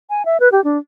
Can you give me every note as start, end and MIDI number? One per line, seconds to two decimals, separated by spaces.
0.10 0.25 80
0.25 0.37 76
0.40 0.49 71
0.52 0.63 67
0.64 0.78 62